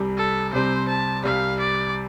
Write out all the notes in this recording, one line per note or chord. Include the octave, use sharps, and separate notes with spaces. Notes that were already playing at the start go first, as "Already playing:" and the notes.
Already playing: C2 C3 G3
A4
C2 C3 G3 C4 C5
A5
C2 C3 G3 F5
D5